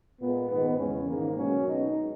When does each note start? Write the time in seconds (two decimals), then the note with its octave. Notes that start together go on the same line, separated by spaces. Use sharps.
0.20 A#2 G#3 B3
0.50 G#2 D#3 G#3 B3
0.79 E2 C#3 G#3 C#4
1.08 G#2 D#3 G#3 A#3
1.37 B2 F#3 C#4
1.66 B2 G#3 D#4